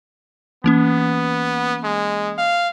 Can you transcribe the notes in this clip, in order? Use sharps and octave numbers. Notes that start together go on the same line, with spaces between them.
E3 A#3 B3 C#4
G#3
F5